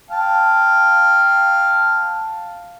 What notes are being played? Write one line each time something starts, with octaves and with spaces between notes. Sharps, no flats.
F5 G5 A5